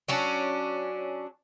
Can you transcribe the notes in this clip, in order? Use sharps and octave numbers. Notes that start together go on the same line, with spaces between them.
F#3 C#4 D4